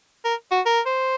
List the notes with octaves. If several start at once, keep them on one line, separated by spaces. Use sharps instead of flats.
A#4
F#4
A#4
C5